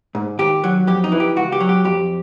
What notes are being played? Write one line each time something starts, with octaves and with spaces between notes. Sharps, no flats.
G#2
D#2 G4
F#3
F2 G4
D#4
E3
G4
C#2 F#4
G4
F#3
G4
F2 G4